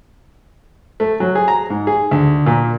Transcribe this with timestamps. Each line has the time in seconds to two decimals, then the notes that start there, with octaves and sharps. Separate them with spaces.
1.00 A3
1.20 F#3
1.35 G#4
1.48 A#5
1.70 G#2
1.87 G#4
2.11 D2
2.46 A#2